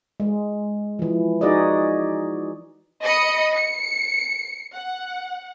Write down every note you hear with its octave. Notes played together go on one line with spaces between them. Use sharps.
G#3
E3 F3
D#4 F#4 G#4 D5 D#5
D#5 B5 D#6 C#7
C#7
F#5